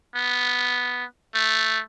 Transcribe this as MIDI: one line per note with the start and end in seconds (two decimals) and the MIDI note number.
0.16 1.04 59
1.35 1.80 57